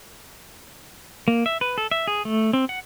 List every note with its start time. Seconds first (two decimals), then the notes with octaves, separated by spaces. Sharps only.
1.28 A#3
1.46 E5
1.61 B4
1.78 A4
1.91 E5
2.07 G#4
2.25 A3
2.53 C4
2.69 F#5